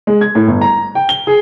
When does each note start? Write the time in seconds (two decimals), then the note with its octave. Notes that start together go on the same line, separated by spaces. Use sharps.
0.07 G#3
0.21 G#6
0.35 A2
0.47 G1
0.61 A#5
0.95 G5
1.09 G7
1.27 G#4